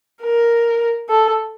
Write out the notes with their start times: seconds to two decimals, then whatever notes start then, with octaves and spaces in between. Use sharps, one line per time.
0.22 A#4
1.09 A4